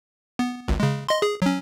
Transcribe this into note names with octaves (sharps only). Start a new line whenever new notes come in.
B3
G#1 C#2
C#3 G#3
D#5 C6
G#4
F#3 C#4